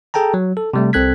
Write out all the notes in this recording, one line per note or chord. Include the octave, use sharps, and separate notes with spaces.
G#4 A4 G5 A5 A#5
F#3
A4
C3 G3 A3
C2 C4 A4 F#6 G#6 B6